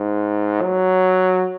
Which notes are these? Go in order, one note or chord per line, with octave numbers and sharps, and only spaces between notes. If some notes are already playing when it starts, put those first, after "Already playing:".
Already playing: G#2
F#3